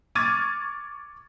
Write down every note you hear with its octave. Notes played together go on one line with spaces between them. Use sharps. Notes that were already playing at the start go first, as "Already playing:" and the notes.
C#6 D6 F6 G#6 A6 D#7